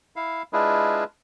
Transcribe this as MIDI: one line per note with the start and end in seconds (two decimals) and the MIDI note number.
0.16 0.43 64
0.16 0.43 77
0.53 1.04 56
0.53 1.04 62
0.53 1.04 64
0.53 1.04 65
0.53 1.04 68
0.53 1.04 71